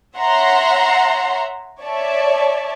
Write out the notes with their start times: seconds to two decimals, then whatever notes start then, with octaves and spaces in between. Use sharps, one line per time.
0.17 C#5 E5 F#5 A#5 C6
1.81 C#5 D5 E5 A5